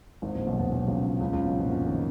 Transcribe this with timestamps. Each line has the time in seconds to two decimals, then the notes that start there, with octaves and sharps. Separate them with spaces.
0.22 G#1 G#2
0.35 A#1 A#2
0.47 B1 B2
0.59 B1 B2
0.72 B1 B2
0.87 C#2 C#3
1.21 C#2 C#3
1.33 C#2 C#3
1.45 B1 B2
1.57 A#1 A#2
1.70 F#2
1.86 D#3